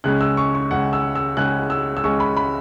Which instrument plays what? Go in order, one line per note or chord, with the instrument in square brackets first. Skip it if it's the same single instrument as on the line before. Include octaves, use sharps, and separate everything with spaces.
[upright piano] C#2 C#3 G#3 C#4 F#6
E6
C#6
C#6
C#2 C#3 G#3 C#4 F#5
E6
E6
C#2 C#3 G#3 C#4 F#6
E6
E6
C#2 C#3 G#3 C#4 C#6
B5
B5